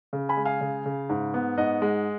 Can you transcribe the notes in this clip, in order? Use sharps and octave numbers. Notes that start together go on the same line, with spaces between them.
C#3
G#5 B5
G#3
F5 G#5
C#3
C#3
G#2
B3
G#2 D#5 F#5
G#3